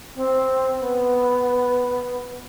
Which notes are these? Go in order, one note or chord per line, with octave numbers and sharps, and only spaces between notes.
C4
B3